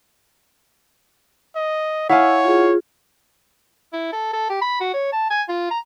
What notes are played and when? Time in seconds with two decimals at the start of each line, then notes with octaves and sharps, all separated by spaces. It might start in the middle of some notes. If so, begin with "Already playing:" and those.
1.56 D#5
2.09 E4 C#5 F5 F#5 G#5 E6
2.44 F4 G#4
3.93 E4
4.12 A4
4.33 A4
4.50 G4
4.62 B5
4.80 F#4
4.93 C#5
5.13 A5
5.30 G#5
5.49 F4
5.71 A#5